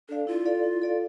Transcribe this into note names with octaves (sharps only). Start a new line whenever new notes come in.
D4 A4 D5 F5
E4 F4
A4 D5 F5
E4
A4 D5 F5